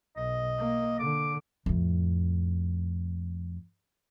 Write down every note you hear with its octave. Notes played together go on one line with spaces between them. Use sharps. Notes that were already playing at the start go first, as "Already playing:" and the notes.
B1 D#5
A#3
D3 D6
F2 A2